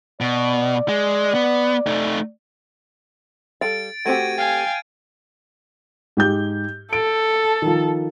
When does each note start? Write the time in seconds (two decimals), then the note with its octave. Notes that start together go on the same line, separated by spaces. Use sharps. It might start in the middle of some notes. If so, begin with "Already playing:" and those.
0.21 B2 D5
0.89 G#3
1.35 B3
1.86 A3 D#4
3.61 G3 A4 F5 A6 D7
4.06 A3 C4 F#4 G4 G#6 A6 D#7
4.38 F5 G5 G#5
6.17 G#2 G4 G6
6.93 A4 D7
7.62 D#3 F3